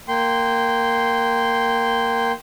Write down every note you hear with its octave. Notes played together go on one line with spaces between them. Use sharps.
A#3 G5 C6